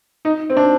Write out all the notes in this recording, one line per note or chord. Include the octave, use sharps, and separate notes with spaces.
D#4
C4
D4